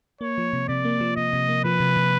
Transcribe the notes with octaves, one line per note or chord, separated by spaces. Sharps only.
A#3 C#5
F3
C3
C3 D5
A#3
F3
C3 D#5
C3
A#3
F3 B4
C3
C3